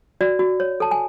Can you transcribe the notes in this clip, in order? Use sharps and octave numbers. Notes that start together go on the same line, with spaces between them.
F#4 D5
F#4
C#5
A4 A5
G#5